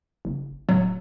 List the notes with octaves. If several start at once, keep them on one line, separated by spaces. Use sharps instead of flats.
F#1
D1 F#3